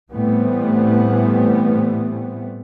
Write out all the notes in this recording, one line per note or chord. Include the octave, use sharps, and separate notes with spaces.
A2 E3 G3 A3 B3 C4